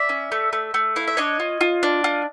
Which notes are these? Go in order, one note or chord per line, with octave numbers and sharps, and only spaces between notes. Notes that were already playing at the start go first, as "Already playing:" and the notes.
Already playing: D5 E5
C#4
A3
A3
A3
E4 F5
E5
D4 C#5 D#5
F4
F4
D4
F4